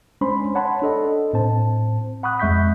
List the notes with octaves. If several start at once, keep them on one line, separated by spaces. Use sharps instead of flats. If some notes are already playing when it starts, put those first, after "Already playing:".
G#3 C#4 D4 C5 B5 C6
C#5 F#5 A5 B5 C6
D4 A4 D#5
A2 C4 C5 A5
F#5 B5 C#6 D#6 F#6
F2 G#3 E5 C#6 G6 B6